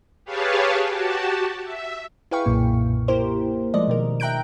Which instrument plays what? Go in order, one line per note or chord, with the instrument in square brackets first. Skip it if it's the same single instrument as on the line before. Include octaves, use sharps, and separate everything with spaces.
[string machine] G4 G#4 B4 C#5 F5 A5
F#4 G4 A5
E5
[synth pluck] E4 G#4 B4 F5 G5 C#6
B1 F#2 A#2 A#3
A#3 E4 G4 A#4 C5
F3 G#3 A3 D5 D#5
B2 D#3 A#4
E5 G5 A#5 F#6 G6 D7